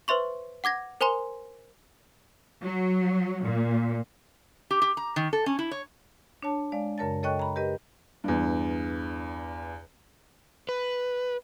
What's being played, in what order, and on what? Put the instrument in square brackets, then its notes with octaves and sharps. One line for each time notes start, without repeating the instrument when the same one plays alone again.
[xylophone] B4 C5 E5 C6 C#6
F#5 D6 G#6 A#6
A#4 C5 G#5 A#5 C6 G7
[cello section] F#3
A#2
[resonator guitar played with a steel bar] G4
G4
A#5
D#3
A4
C#4
E4
C#5
[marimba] D4 C#5 A5
G#3 D5 F5
F#2 C#3 A#4 C#5 A5 A6
A4 C#5 D#5 G5 C#6 F#6
A#5 B5
G4 A#4 B4 D#5
[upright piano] E2 G2
[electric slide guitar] B4